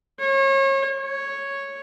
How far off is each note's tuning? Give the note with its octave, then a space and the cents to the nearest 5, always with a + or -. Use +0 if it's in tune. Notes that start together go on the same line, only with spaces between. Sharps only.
C#5 -35
C#5 -5